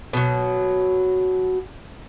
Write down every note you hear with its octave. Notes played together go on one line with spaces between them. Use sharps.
B2 F#3